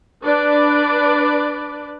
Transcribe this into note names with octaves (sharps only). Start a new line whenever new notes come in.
D4 B4 D5